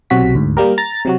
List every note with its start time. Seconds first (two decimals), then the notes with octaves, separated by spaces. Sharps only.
0.10 B1 C3 F#3 F#4 B6
0.35 D2 G#2
0.57 G3 A#3 G4 A#4
0.78 A#5 A6
1.05 C3 F#3 F#4